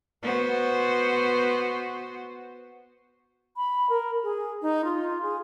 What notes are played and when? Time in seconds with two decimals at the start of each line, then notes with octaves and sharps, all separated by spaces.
0.22 B3 F#4 C5
3.57 B5
3.90 A#4
4.23 G#4
4.62 D#4
4.85 F4
5.22 G#4